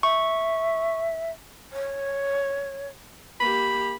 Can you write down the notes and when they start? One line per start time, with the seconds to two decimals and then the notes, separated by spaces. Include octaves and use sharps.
0.03 E5 C#6
1.72 C#5
3.40 A#3 G4 B5